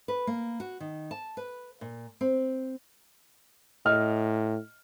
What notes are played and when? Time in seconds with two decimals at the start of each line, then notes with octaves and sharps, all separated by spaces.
0.08 B4
0.27 A#3
0.60 F#4
0.80 D#3
1.11 A5
1.37 B4
1.81 A#2
2.21 C4
3.85 A2 D#5 F6